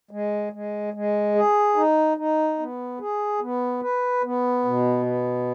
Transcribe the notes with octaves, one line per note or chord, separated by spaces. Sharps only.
G#3
G#3
G#3
G#4
D#4
D#4
B3
G#4
B3
B4
B3
B2
B3